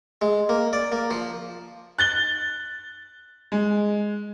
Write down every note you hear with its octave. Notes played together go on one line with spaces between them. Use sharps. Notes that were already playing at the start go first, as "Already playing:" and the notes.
G#3
A#3
D5
A#3
F3
F#6 A6 G7
G#3